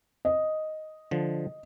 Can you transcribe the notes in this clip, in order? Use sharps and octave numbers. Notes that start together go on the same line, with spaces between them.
D#5
D3 F3